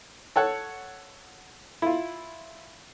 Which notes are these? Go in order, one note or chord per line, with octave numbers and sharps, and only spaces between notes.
A4 C#5 F#5
E4 F4